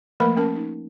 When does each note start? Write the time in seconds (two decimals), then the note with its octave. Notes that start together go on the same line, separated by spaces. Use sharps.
0.20 F3 A3 A#3 A#4 B4 B5
0.37 C#4 A#4 A5
0.56 D#4